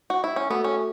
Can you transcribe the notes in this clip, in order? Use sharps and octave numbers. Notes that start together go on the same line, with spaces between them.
F#4
E4
C#4
A3 B3 F#4 A4
C#4